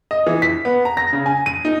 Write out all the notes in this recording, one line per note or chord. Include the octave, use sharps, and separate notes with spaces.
D#5
E3
B6
B3
A#5
A#6
C#3
G#5
D#7
D#4